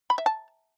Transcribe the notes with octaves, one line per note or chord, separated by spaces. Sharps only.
B5
E5
A5